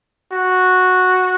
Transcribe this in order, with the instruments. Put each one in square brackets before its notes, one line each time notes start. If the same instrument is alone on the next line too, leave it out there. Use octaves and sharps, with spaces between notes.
[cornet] F#4